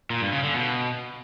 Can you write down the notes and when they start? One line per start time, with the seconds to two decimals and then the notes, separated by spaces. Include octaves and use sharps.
0.10 A#2
0.21 G2
0.32 C#3
0.43 D3
0.55 B2